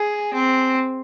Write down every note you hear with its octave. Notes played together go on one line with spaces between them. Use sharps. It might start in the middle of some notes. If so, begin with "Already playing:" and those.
Already playing: G#4
C4